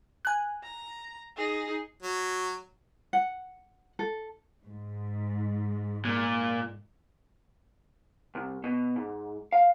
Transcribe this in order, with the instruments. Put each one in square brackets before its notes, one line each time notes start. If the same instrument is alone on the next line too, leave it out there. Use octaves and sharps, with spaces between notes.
[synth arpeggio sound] G#5 F#6
[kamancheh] A#5
D#4 G#4
[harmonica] F#3
[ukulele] F#5
A4
[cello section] G#2
[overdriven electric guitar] A#2
[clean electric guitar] C2
B2
G#2
F5